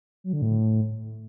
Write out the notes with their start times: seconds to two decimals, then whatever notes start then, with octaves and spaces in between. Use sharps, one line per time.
0.24 F#3
0.33 D3
0.42 A2